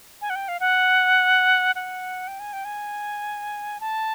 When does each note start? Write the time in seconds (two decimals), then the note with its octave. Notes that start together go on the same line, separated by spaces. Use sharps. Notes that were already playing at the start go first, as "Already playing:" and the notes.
0.22 G#5
0.30 F#5
0.36 G5
0.48 F5
0.60 F#5
1.75 F#5
2.28 G5
2.40 G#5
2.53 G5
2.65 G#5
3.80 A5